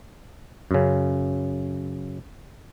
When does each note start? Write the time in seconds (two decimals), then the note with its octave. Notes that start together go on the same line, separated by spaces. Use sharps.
0.71 F#2 C#3